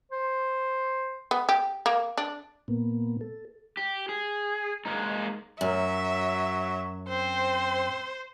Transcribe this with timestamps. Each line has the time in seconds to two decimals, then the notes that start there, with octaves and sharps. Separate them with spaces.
0.12 C5
1.31 B3
1.49 G4
1.86 A#3
2.18 D4
2.68 A#2 A#3 B3
3.21 A4
3.77 G4
4.09 G#4
4.85 G#3 A#3 D#4
5.61 F#2 F#3 E5
7.08 C4 C5